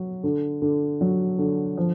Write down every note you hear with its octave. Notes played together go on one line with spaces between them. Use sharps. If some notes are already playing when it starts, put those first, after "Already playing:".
Already playing: F#3
D3
D3
F#3
D3
F3